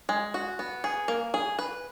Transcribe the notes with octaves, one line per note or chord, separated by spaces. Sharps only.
G#3
F#4
B3
G#4
A#3
G#4
B4